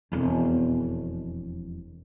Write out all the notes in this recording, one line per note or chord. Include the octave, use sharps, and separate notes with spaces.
E1 F2